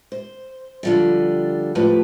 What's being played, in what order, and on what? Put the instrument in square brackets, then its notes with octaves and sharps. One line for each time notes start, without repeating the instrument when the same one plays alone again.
[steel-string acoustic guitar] C5
D3 F3 G3
A2 F3 G4 B4 A#5